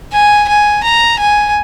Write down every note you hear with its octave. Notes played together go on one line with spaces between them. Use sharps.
G#5
G#5
A#5
G#5